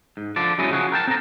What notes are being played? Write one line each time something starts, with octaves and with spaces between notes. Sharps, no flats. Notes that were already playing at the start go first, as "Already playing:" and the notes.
G#2
D3 F3 D5
F#3 G#3 C#4 E4 D#5
C#3 F3 F#4 G#4
A#4 G5 A5
C4 A4 A#5